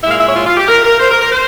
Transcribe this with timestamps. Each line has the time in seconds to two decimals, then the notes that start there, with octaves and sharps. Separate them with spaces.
0.04 A#2 G#3 E4 E5
0.11 F5
0.20 E5
0.28 C#5
0.36 F4
0.46 F4
0.57 G4
0.68 A#4
0.84 A#4
1.00 C5
1.11 A#4
1.21 A#4
1.32 C5